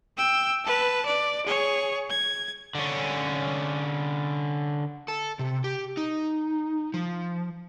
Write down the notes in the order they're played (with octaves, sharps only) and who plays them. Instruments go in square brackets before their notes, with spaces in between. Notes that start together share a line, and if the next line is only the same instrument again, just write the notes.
[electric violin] G5 E6
B4 A5
D5
G#4 C#5
G#6
[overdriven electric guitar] D3 C#4
[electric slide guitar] A4
C3
G4
D#4
F3